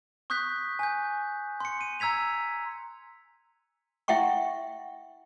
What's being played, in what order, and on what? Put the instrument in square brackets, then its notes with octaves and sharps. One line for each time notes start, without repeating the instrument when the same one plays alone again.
[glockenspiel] C#6 D#6 F#6 G6 B6
G#5 G6
C6 C#7
D#7
A#5 E6 G#6 B6 F7
[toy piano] E4 E5 F#5 G5 C#6